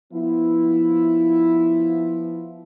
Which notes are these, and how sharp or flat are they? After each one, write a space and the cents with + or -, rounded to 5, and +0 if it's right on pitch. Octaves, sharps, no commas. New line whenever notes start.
F3 +0 B3 +0 E4 +0